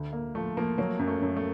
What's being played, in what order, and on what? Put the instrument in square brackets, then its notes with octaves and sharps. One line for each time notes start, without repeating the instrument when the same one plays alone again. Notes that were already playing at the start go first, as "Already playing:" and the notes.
Already playing: [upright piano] D2
A#3
[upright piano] F3 [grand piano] A3
[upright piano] F3 [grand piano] A#3
[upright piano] F#3 [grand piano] A#3
[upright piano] F#2
[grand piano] A3
[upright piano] F#2
[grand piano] A3